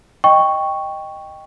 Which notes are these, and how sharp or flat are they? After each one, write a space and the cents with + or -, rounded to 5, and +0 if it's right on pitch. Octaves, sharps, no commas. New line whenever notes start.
D#5 +0 G5 +5 C#6 +0